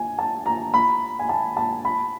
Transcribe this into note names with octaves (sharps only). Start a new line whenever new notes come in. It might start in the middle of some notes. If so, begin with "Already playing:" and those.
Already playing: G#5
A5
A#5
B5
G#5
A5
A5
B5